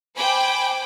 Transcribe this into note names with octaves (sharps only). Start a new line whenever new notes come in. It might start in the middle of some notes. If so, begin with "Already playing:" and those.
C5 G5 G#5 B5 D6